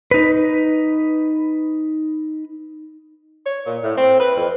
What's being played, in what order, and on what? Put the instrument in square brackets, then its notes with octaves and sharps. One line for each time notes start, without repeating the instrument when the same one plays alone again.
[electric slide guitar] D#4 B4
[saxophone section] C#5
A#2
A2
C4
B4
F2